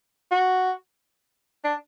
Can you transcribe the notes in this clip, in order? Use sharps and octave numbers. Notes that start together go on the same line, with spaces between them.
F#4
D4